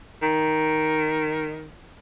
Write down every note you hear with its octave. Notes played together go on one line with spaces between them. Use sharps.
D#3